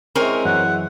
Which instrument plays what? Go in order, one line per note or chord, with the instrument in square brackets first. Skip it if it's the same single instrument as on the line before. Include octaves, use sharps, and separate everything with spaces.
[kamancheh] G#3 E4 [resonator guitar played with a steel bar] C4 C#4 A#4
[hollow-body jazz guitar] F#2 E3 [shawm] F#5